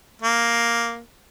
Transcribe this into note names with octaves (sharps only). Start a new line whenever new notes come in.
A#3